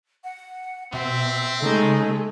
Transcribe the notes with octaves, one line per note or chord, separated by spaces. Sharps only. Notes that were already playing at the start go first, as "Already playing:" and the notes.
F#5
B2 C4 E5
C#3 G#3 A3 D#4